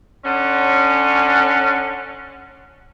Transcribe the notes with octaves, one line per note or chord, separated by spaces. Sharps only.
D3 C#4